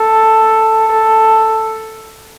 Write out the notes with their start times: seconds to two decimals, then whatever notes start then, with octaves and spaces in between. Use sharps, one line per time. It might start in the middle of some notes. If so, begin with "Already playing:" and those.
Already playing: A4
0.91 A4